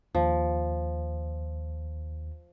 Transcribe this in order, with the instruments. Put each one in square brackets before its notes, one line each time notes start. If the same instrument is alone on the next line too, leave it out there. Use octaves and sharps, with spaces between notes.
[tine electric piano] D#2 [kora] F3